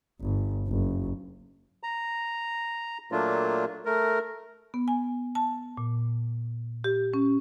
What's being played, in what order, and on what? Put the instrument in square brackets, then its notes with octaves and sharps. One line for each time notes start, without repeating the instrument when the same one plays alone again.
[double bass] G1
F#1
[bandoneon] A#5
A#2 F#3 A3 A#3 D4 F4
A3 A#4
[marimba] B3
G#5
A5
A#2
G4
C#4